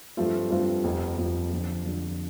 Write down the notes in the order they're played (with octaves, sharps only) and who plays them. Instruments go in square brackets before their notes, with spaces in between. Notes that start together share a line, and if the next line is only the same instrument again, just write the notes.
[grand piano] G2 F3 A3 C4 F4
G2 F3 A3 C4 F4
F1 F2 F3
F1 F2 F3
F1 F2 D3 F3
F1 F2 D3 F3